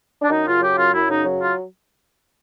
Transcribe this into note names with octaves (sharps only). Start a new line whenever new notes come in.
D4
F#2 D#4
C#3 F4
F#3 G4
F#2 F4
F#2 E4
C#3 D#4
F#3
F4